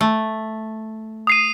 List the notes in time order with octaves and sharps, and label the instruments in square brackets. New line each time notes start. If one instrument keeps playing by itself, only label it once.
[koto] A3
[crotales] D#6 C7 D#7